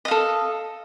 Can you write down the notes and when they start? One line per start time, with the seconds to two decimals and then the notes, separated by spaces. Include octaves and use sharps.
0.05 D#5
0.08 F5
0.11 A4